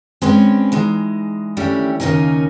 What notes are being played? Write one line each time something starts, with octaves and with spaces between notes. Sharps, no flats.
G#3 C4 C#4 B4 C#5 D5
E3 G#3 D#4
D#3 E3 G3 A3 C#4 D4
D#2 C#3 A#3 C#4 D#4 G#5